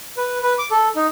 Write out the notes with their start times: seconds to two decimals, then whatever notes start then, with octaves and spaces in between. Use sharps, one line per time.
0.17 B4
0.43 B4
0.59 D6
0.71 A4
0.96 D#4